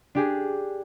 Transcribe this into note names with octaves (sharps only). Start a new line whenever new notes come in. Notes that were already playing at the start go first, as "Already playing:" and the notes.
D4 G4 G#4